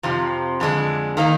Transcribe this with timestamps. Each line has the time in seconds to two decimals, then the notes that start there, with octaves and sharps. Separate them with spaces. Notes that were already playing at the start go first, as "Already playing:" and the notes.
0.03 F2 C3 F3
0.60 F2 D3 G#3 D4
1.17 D#3 A#3 D#4